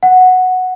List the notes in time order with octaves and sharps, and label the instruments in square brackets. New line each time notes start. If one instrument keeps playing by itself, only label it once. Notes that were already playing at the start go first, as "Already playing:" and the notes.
[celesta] F#5